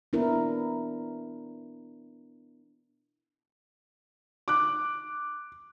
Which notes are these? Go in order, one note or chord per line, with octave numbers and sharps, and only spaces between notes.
B3 D4 E4 A#4
D6 F#6